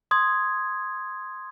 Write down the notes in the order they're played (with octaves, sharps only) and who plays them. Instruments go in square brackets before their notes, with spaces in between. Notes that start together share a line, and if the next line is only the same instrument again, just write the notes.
[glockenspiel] C6 D#6 G#6